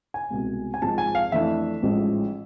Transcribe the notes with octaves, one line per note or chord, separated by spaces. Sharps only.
G#5
C2 B2 G#3
G#5
G#1 G#2 F3 G#3 A5
G#5
F5
F2 E3 A3 D4 E5
A1 G#2 F3 G#3